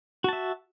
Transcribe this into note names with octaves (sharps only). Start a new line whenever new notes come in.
F#4 E5 A5